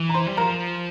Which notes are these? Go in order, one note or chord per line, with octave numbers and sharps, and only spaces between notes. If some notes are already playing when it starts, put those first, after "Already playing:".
Already playing: E3
A#5
C5 C6
G3
F3 A#4 A#5